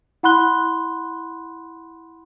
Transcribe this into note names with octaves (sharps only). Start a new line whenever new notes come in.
E4 F#5 B5 C6 F#6 G7